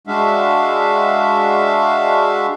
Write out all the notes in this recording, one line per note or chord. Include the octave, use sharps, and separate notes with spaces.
G#3 D4 F#4 E5 F5